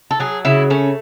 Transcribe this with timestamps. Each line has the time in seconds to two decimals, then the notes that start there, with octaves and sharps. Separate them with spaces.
0.11 A4
0.20 F#3 G#4
0.45 C#3 E4
0.70 A3 C#4